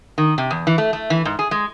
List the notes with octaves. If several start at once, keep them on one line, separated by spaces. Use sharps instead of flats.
D#3
C3
E2
E3
A3
A3
E3
G#2
G#4
G#3